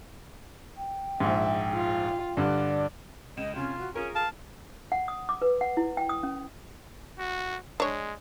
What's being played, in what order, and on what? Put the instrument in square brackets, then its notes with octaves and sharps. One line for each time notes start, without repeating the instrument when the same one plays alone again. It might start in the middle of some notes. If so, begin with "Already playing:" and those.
[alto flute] G5
[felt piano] A#1 G#2 [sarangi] E5
[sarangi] F4
[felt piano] G2 D3 [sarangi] D5
[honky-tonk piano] C#2 D#7 E7 [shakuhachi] D#5
[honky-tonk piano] C3 [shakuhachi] C#4 [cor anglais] F4
[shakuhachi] F#4
[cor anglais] C#4 [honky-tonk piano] F4 A#4 [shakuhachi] G#4
[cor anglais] F5 [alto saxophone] A5
[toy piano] F#5
D#6
D6
B4
F#5
E4
G5
D#6
C#4
[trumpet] F#4
[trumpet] G#3 [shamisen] D4 C#5